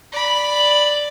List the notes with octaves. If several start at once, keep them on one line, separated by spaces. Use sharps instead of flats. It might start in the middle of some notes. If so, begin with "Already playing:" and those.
D5 B5